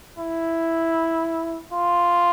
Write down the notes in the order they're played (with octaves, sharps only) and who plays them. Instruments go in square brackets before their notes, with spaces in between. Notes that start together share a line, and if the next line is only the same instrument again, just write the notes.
[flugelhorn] E4
F4